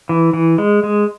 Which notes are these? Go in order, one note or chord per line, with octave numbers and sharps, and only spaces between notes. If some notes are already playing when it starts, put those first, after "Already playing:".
E3
E3
G#3
G#3